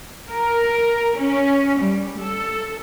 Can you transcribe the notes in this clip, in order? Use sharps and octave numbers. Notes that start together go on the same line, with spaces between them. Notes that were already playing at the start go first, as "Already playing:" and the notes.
A#4
C#4
G3
A4